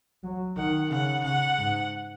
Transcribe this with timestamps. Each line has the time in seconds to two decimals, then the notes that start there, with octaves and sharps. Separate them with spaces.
0.23 F#3
0.57 D#3 F#5
0.90 C#3 F#5
1.23 C#3 F#5
1.58 G#2